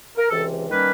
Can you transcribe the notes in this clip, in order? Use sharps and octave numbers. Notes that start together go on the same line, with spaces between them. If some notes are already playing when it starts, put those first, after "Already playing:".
A#4
C#2 C3 E3 A4
D#3 G3 A#3 C#4 B4